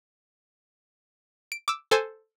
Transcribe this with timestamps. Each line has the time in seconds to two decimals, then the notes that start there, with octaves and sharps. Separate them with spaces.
1.52 D7
1.68 D6 E6
1.91 A4 C5 G#5